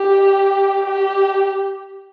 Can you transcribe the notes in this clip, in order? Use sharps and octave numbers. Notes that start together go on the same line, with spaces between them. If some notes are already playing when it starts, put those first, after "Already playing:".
Already playing: G4
G4